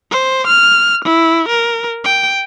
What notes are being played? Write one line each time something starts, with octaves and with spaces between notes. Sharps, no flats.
C5
F6
E4
A#4
G5